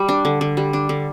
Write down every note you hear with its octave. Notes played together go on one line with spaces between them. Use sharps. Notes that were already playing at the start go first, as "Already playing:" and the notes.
Already playing: G3
D4
D3
D3
G3
D4
D3